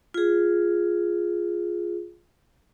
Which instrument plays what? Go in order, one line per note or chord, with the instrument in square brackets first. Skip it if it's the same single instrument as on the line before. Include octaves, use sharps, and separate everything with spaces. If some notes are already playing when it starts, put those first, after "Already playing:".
[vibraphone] F4 G#4